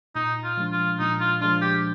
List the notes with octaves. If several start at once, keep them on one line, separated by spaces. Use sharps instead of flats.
A#2 D#4
F4
F3 G#3 D4
F4
A#2 D#4
F4
F3 G#3 D4 F4
G4